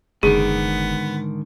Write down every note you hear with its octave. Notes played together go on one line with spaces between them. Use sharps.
F#1 G#2 D3 D#3 B3 G#4